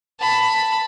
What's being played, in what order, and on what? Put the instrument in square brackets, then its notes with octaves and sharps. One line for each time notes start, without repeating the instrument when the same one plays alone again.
[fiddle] A5 B5